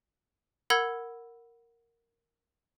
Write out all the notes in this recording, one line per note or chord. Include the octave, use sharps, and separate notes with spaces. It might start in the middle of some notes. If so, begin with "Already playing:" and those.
A#4 F#5 B5 E6 G#6